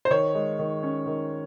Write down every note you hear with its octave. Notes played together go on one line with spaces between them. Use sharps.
C5
D#3 C#5
G#3
D#3
C#4
D#3